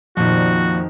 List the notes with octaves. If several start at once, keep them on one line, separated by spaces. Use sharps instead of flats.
F2 A#2 D#3 F3 F#4 G4